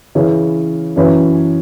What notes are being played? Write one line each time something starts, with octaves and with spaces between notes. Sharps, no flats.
C#3 E3 C#4 E4
F#2 E3 C#4 E4